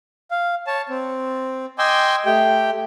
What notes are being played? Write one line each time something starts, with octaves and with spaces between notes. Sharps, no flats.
F5
C#5 A5
C4
D#5 G5 G#5 C6 D6 E6
A3 G4 G5